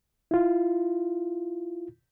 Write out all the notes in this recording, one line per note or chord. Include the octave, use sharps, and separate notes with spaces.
E4 F4